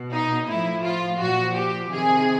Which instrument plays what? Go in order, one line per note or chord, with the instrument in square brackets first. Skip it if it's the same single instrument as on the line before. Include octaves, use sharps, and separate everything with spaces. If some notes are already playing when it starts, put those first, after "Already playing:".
Already playing: [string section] B2
D#4
A2 F3 E4
F4
A#2 F3 F#4
G4
C3 D#3 G#4